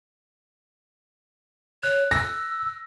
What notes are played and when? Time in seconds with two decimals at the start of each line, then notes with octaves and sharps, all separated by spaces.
1.83 C#5 F#6
2.11 E6 A#6